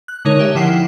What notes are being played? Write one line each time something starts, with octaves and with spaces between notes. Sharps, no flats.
F#6
D3 G#3 D#4 A#4 C#5
G4 C#5 E5
D3 F3 E4 F#5 G5 C7